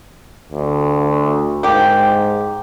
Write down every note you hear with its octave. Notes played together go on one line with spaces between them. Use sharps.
D2
G#2 A#3 G4